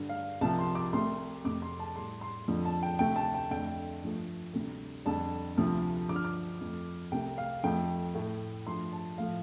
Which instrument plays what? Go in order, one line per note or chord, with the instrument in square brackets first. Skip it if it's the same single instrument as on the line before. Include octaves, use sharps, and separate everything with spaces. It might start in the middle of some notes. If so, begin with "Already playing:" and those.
Already playing: [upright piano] G2 D3 G3
F5
C2 C3 F3 A5
C6
D6
C2 C3 A3 C6
F2 C3 A3 D6
C6
A5
A2 G3 C6
C6
F2 D3 F3
A5
G5
D2 C3 A3 G5
A5
G5
F2 D3 A3 G5
G2 F3 A3
D2 C3 G3
F2 D3 G3 A5
D2 C3 F3 A3
G2 D3 F3 D6
F6
D6
F2 F3 A3
C2 C3 A3 G5
F5
F2 F3 A3 G5
A2 A3
G2 F3 A3 C6
A5
A2 F3 A3 F5